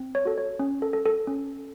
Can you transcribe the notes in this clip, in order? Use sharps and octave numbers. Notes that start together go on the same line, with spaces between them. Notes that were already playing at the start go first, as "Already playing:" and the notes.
Already playing: C4
C#5
F#4 A4
C#5
C#4
A4
A4
A4
C#4